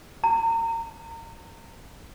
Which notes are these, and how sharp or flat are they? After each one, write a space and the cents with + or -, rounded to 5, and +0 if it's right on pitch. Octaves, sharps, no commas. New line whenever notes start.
A#5 -30